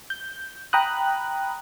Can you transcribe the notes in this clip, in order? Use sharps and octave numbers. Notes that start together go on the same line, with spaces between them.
G6
G5 A#5 B5 D#6 F#6